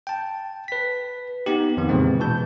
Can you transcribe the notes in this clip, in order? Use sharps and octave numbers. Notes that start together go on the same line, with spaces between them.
G5 A5
B4 B6
B3 D#4 G4
F2 D#3 B3
A#2 C#3 E3 G#3 C4
B2 E3 A5 G6